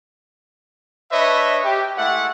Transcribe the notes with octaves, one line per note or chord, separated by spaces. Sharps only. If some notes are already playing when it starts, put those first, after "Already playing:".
D4 B4 C#5 D#5 E5
G4
G#3 A3 E4 F#5